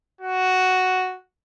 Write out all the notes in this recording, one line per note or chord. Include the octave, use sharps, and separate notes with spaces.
F#4